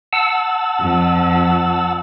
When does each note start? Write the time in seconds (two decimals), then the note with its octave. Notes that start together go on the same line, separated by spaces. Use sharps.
0.13 F#5 A5 E6
0.81 F2